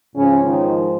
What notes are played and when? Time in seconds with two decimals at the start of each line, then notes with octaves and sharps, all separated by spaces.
0.16 G#2 C#3 F3 C#4
0.44 D#3 D#4